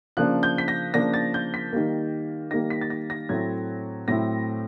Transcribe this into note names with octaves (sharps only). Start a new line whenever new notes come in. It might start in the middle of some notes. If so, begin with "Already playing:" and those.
C#3 F3 A#3 D4 F#6
G6
B6
A#6
C#3 F3 A#3 D4 A#6
A6
G6
B6
D#3 G3 A#3
D#3 G3 A#3 A#6
B6
A6
A#6
A#6
A2 F#3 A3 C4 E4 G#6
A2 F#3 A3 C4 E4 A#6